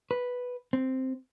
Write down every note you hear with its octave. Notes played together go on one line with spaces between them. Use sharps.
B4
C4